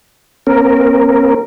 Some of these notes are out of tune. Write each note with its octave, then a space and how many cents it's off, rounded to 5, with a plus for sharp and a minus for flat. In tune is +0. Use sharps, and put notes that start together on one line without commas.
A#3 +45 C#4 -45 A#4 -5